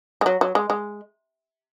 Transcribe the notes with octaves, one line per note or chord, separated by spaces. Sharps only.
G#3
F#3
F#3
G#3
G#3